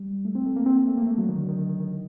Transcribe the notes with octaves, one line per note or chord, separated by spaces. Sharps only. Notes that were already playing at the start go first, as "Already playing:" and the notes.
Already playing: G3
A3
C4
A3
A#3
C4
A#3
A3
A#3
A3
F#3
D#3
D3
D#3
D#3
D#3
D#3